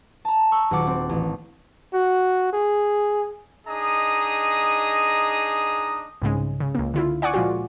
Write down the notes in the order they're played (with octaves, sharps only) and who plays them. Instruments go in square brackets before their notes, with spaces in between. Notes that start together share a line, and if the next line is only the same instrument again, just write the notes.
[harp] A5 A#5
C#6 E6
D#1 F#3 F#5 D6 A6
C4
A1
[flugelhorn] F#4
G#4
[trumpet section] D4 D#4 G#4 D#5 A#5 D#6
[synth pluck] C2 G#2 C#3 G#3
C#3
C#2 A#3
D3 E4 F4
D5 F#5 G#5 C#6 D6
A#2 F3 G#3 F4 F#4